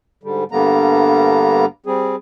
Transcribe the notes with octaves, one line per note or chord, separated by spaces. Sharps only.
G#2 D3 G3
G2 D3 G3 A#3 B3 A#5
G3 C4 G#4